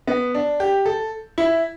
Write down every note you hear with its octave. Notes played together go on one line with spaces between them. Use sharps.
B3
D4
G4
A4
E4